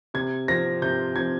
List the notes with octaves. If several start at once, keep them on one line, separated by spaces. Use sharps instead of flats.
C3 G#6
F3 C4 A#6
C3 G6
F3 C4 G#6